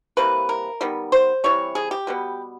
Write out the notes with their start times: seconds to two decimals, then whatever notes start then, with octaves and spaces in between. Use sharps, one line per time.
0.17 C3 E3 G3 A#3 B4
0.49 A#4
0.81 D#3 G3 B3
1.12 C5
1.44 C3 E3 G3 C#5
1.75 G#4
1.91 G4
2.07 B2 G3 B3